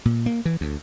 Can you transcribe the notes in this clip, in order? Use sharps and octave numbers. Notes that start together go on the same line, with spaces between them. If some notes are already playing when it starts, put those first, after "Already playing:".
A#2
A#3
E3
D2